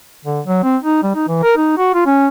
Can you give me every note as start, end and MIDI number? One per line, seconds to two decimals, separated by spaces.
0.25 0.40 50
0.46 0.60 54
0.63 0.77 60
0.83 1.01 63
1.03 1.11 55
1.15 1.27 63
1.28 1.39 52
1.43 1.52 70
1.57 1.76 63
1.77 1.90 66
1.95 2.03 65
2.06 2.28 61